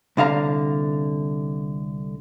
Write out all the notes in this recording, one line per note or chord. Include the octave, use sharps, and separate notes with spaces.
C2 D3 F5 A#5